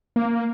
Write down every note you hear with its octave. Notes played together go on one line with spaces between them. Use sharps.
A#3